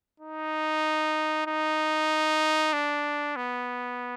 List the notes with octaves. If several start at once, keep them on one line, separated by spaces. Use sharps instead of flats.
D#4
D#4
D4
B3